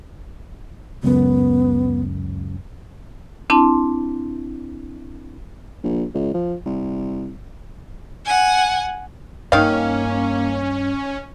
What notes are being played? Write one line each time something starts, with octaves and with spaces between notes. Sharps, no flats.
C#2 F#2 B3
C4 D4 E4 A5 C6
A#1
C#2
F3
C2
F#5 G#5
G2 D#3 A#3 C#4 F5